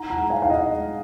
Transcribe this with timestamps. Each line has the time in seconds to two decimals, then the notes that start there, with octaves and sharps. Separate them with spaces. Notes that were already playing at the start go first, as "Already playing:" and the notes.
Already playing: D#4 F#5 A#5
0.10 F#5 A#5
0.17 G#3
0.30 F5 G#5
0.42 D#4 F5
0.50 D#5 F#5
0.70 G#3